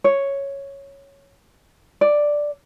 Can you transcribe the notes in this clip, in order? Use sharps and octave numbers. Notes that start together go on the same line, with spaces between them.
C#5
D5